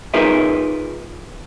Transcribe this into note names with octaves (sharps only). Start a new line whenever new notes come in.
D#4 F4 G#4 A#4 B4 E5